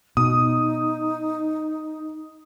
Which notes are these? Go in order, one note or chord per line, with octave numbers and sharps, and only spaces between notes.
B2 D#4 D#6